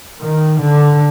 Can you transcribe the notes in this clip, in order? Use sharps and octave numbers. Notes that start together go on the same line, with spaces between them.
D#3
D3